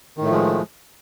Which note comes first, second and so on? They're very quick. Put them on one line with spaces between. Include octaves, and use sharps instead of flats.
D#3 A2 A3 F3 G#3